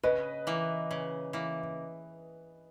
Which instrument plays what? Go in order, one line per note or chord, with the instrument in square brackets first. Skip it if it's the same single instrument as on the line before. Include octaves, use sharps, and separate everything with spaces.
[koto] C#3 [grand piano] B4 D#5
[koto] E3 A#3
C#3
E3 A#3